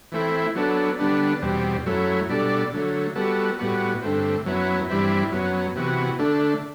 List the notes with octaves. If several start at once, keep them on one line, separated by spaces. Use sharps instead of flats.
E3 A3 C4 E4
F#3 B3 D4 A4
D3 G3 B3 D4
E2 B2 G3 C4
F#2 F#3 A3 E4
B2 G3 D4 A4 D5
D3 F#3 A3
G3 B3 F#4 A4
A2 G3 B3 F#4
G2 D3 A3 C4
F#2 F#3 B3 E4
G2 E3 G3 C4 E4
F#2 F#3 B3
C3 E3 B3 F#4
D3 A3 D4